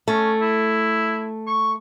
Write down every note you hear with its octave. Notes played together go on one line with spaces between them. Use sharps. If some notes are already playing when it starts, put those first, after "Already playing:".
A3 C#4
E4
C#6